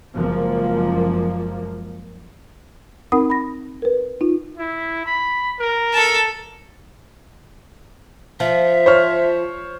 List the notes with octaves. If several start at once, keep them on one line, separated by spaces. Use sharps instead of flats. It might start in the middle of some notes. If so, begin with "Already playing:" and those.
F#1 F3 G#3 A#3
C4 D#4 A#4 F#5 B5 D#6
B5 A#6
A#4 B4
D#4 F4
E4
B5
A#4
A4 A5
F3 E5
C5 C#5 F6